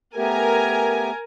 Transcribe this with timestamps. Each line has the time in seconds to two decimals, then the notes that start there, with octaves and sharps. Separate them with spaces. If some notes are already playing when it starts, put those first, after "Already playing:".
0.17 A3 B3 G4 A#4 G#5